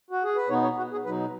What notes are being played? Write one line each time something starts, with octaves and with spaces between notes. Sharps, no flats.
F#4
G#4
B4
B2 B3 D#4 C#5
C#5
F#4
G#4
B2 F#3 D#4 B4